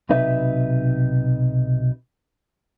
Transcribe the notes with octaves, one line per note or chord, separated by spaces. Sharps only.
B1 C3 D#4 B4 E5